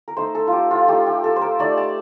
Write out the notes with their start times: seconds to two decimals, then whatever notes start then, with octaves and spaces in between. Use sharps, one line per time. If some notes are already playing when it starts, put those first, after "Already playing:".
0.08 A#4
0.17 A3 D#4 C5
0.35 A4
0.47 F4
0.52 G4
0.71 F4
0.88 A3 D#4 G4
1.06 G4
1.24 A4
1.36 C5
1.41 A#4
1.59 A3 D#4 D5
1.77 A5